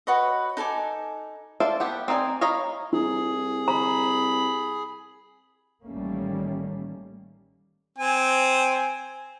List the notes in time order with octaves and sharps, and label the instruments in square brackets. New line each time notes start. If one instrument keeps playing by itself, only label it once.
[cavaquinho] F#4 B4 C#5 D#5
D#4 A4 G#5 D6
[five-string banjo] A4 C5 D5 E5 F5
B3 G4 F#5
C4 D#4 F4 D5 G#5
C#5 D#5 F5 A#5 B5
[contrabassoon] C2 [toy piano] E4 [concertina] G#4
[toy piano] A#5 [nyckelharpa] B5
[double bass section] A1 D#3 G3 A3 A#3 C#4
[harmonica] C4 G#5